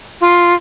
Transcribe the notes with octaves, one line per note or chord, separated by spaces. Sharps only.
F4